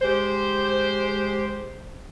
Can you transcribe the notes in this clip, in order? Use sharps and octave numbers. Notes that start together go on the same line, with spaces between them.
G#3 G4 C5